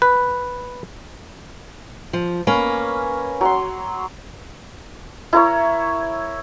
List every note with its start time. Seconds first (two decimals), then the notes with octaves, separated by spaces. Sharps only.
0.02 B4
2.13 F3
2.47 A#3 C#4 B4
3.41 F#3 C6
5.33 E4 A#4 C#5